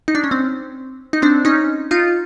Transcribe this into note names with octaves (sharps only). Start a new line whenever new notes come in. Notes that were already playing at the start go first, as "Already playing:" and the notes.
D#4
D4
C#4
C4
D#4
C4 D4
C#4 D#4
D#4 F4